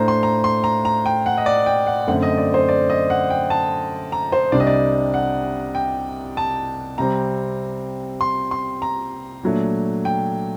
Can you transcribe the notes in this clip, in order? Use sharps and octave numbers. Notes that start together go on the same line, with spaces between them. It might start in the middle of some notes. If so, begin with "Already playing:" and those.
Already playing: A2 A3 D4 C5 A#5
C6
A#5
C6
A#5
A#5
G5
F#5
D#5
D5
G5
F#5
F#2 D3 A3 C4 F#5
D#5
D5
C5
D5
D#5
F#5
G5
A5
A#5
C5
C2 C3 G3 D4 D5
D#5
D5
F#5
G5
A5
C3 G3 C4 A#5
C6
C6
A#5
A#2 F#3 A3 D4
G5